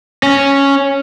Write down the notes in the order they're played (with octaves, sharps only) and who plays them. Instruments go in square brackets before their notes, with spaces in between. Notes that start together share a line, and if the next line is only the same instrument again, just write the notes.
[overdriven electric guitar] C#4